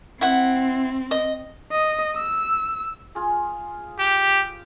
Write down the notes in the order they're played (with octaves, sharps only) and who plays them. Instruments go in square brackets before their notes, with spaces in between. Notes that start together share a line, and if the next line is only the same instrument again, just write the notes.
[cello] C4 [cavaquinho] E4 F#5
[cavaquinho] D#5
[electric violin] D#5
E6
[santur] F4 G#4
[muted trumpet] G4